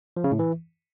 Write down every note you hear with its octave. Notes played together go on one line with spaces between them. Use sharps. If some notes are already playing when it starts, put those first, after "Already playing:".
F3
C#3
A2
E3